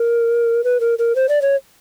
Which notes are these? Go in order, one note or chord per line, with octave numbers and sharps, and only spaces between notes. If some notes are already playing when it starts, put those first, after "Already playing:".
Already playing: A#4
B4
A#4
A#4
C5
D5
C#5